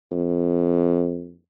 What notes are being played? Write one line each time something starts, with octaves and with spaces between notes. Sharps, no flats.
F2